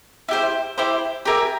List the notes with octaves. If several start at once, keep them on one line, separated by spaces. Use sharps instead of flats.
E4 G4 C5
E4 G4 C5
G4 A#4 E5 G#5